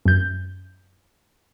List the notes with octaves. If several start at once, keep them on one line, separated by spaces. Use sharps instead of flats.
F#2 G6